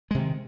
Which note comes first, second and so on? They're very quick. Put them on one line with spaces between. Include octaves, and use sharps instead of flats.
G#3 C3 D#3